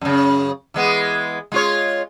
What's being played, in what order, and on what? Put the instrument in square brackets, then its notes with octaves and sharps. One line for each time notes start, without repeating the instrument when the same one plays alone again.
[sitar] F#2 C#3
E3 G#3 B3
G#3 F4 C#5